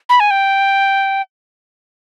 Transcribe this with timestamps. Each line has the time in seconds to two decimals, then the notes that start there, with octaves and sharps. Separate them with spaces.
0.09 B5
0.20 G#5
0.31 G5